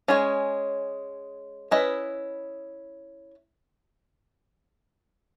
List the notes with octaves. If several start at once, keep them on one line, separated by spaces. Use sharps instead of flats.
G#3 C#4 G#4 C#5
C#4 E4 B4 D#5